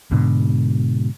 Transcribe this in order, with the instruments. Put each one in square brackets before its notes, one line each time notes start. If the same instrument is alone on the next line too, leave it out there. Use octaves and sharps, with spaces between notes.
[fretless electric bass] G#2 B2 D3